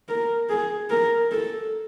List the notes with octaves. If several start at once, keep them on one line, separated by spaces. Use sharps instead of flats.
A#4
G#4
A#4
A4